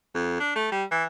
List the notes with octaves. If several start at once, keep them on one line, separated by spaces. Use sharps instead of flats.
F2
D4
A3
G3
E3